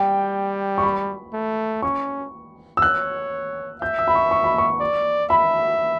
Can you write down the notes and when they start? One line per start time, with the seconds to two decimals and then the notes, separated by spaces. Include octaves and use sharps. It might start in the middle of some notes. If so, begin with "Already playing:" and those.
Already playing: G3 G5
0.78 C#6
0.83 B5
1.34 A3
1.82 C#4 C#6
2.77 E6
2.82 C#5 F#6
3.82 E5 G6
3.99 E6
4.08 B5
4.15 C#6
4.31 C#6
4.44 B5
4.58 C#6
4.80 D5
5.30 E5 B5